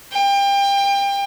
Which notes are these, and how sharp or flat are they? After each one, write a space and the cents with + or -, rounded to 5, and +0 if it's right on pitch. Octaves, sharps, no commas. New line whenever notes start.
G5 +30